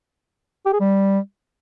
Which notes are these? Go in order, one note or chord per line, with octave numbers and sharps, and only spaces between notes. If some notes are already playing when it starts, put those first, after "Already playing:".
G4
G#4
G3